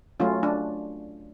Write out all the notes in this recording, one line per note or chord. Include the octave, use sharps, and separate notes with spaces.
F#3 A3 C#4 F4
D4